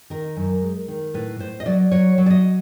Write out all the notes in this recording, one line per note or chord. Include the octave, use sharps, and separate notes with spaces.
D#3 A#4
F#2
G#3
D#3
A2 B4
A2 C5
D#5
F#3 D5
F#3 C#5
F#3
D5
D#5